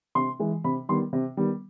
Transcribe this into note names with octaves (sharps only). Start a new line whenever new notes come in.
C3 C6
E3 G#3
C3 B5
D#3 G3 B3 C6
C3
D#3 G3 B3